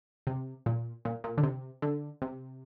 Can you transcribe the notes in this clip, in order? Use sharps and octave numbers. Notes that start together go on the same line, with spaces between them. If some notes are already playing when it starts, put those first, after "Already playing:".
C3
A#2
A#2
A#2
D3
C3
D3
C3